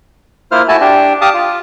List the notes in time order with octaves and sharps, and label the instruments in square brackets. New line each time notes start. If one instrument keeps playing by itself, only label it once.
[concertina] A#3 E4 F4 C5 F6
A3 E4 F#4 G#5 A5
D4 G4
G4 F5 A5 D6 D#6
F4